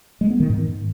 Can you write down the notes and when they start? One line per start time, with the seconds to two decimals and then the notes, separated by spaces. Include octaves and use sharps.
0.21 G#3
0.31 B3
0.40 D#3
0.50 G#2